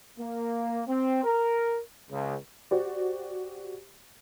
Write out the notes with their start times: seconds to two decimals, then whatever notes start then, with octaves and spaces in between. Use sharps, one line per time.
0.19 A#3
0.88 C4
1.24 A#4
2.11 C#2
2.71 F#4 G4 C5 D5